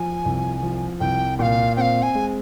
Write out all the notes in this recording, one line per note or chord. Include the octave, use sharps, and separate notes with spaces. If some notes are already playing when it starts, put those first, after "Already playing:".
Already playing: F3 G#5
C2
F3
C2 G5
A#2 F5 G5
C4 F5 G5
G#5
G#3